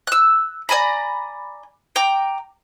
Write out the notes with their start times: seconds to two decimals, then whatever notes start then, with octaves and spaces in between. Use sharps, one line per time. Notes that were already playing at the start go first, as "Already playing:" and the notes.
0.07 E6 F#6
0.69 D5 G#5 A#5 B5
1.96 G5 A#5 D6